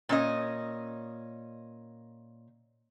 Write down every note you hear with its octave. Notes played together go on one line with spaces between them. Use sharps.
A#2 C#4 D#5